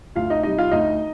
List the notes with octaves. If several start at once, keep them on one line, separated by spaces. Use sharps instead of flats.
D2 F4 F5
D#4 D#5
C3 G3 D#4 D#5
F4 F5
D2 D#4 D#5